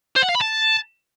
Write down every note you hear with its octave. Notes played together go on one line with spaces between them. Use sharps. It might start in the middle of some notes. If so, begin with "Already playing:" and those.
C5
F#5
F5
B5
A5